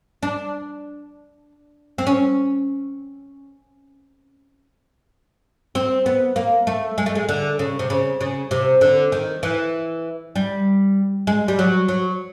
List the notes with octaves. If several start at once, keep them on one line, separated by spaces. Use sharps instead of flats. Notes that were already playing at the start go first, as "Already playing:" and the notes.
D4
C4
C#4
C4
B3
A#3
A3
G#3
A3
G#3
D3
C#3
C3
C#3
C#3
C3
D3
D#3
E3
G3
G#3
G3
F#3
F#3